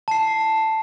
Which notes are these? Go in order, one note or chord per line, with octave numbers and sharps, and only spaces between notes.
A5 C7